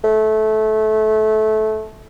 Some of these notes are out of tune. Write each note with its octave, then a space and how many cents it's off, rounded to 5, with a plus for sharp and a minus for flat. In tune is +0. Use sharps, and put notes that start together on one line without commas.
A3 -20